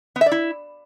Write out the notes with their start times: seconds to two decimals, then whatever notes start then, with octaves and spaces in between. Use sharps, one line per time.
0.16 B3
0.21 E5
0.26 D5
0.32 E4